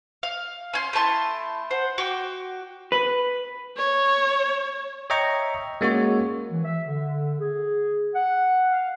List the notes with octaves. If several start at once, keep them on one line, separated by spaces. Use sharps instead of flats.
F5
C#4 G#5 C6
A3 E4 A5 C6
C5 F#5
F#4 G5 D6
B4
C#5
C#5 D#5 E5 G5 A#5 C#6
G#3 A#3 C#4 F#4 C#5
E3
E5
D3
G#4
F#5
F5